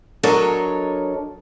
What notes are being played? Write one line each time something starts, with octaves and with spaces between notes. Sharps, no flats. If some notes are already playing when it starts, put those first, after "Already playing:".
F#3 D4 A4 A#4 C#5 D#5